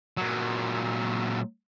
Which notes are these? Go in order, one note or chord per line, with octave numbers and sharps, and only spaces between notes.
A#2 F#3